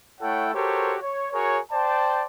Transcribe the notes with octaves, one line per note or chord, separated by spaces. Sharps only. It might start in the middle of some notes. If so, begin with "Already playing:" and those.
A3 E4 A4 C#5 F#5 G5
F#4 G4 A4 A#4 C5 C#5
C#5
F#4 G#4 A#4 C#5
C5 D5 G5 A5